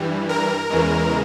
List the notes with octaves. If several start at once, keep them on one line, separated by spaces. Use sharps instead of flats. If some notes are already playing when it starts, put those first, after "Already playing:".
Already playing: G2 E3 G3
A#4
E2 C#3 E3 G#3